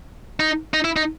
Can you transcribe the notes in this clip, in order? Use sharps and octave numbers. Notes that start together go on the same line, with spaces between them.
D#4
D#4
E4
D#4